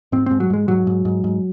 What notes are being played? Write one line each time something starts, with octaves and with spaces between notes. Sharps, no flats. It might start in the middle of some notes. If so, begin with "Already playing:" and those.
G#2 C4
G#2 C4
F#3
G#2 G#3
G#2 F#3
G#2
G#2
G#2